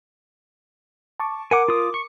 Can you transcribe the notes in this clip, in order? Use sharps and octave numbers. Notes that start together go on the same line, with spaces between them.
A5 C#6 D6
A#4 F#5 G#5 D6
F4 D#6
C#6 C#7